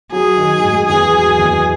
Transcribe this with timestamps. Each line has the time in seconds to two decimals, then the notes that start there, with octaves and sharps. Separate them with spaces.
0.12 F#3 G#4
0.37 D#3
0.62 G#2
0.88 E2 G#4
1.13 F#3
1.38 E2